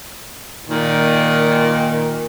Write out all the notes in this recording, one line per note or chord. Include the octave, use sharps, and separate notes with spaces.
A#2 D#3